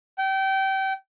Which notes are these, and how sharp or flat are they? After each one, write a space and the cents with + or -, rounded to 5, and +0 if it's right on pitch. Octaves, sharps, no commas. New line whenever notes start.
G5 -25